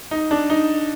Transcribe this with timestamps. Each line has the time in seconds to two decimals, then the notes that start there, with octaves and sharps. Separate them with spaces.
0.11 D#4
0.31 D4
0.50 D#4